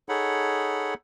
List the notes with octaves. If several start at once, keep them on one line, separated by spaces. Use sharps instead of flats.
D#4 G#4 A4 C#5 F#5 B5